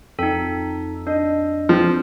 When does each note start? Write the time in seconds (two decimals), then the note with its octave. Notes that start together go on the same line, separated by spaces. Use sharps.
0.19 F2 D#4 A4 G5
1.07 D4 D#5
1.69 F3 C4